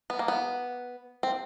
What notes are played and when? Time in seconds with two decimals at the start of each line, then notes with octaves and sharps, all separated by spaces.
0.10 B3
0.19 A#3
0.28 B3
1.23 C4